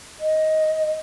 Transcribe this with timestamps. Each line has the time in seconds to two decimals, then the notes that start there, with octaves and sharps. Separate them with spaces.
0.19 D#5